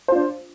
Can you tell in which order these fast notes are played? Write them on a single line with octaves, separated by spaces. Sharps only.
C5 F4 D4